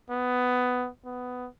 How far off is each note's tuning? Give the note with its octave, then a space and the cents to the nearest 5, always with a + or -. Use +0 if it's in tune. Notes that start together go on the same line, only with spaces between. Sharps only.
B3 +10
B3 +15